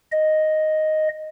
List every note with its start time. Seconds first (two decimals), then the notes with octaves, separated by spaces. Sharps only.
0.12 D#5